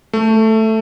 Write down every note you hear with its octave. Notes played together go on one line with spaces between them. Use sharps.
A3